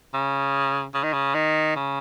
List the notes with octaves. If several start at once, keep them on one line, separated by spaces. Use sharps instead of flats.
C#3
C#3
D#3
C#3
D#3
C#3